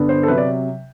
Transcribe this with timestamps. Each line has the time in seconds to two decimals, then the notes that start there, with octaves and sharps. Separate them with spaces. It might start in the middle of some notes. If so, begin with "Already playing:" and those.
Already playing: G2 D3 B3
0.09 C5
0.23 A4
0.28 C3 F#3 B4
0.38 D5